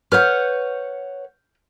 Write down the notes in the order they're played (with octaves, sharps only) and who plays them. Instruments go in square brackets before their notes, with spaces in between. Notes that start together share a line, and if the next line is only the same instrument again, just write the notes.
[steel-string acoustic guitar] B4 C#5 F#5 [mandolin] F6 G6